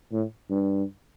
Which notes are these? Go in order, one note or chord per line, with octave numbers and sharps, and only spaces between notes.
A2
G2